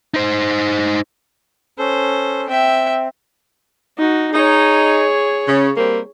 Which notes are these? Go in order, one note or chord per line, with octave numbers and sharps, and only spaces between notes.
D#4 C5
C#4 A4 C5
C4 E5 G5
D#4 F#4
D#4 G#4 C#5
C#3
G3 A#3 C4